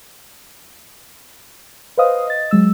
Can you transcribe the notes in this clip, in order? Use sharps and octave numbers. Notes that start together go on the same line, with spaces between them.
B4 C5 D#5 F5 D#6
D#5 A6
F#3 G#3 E6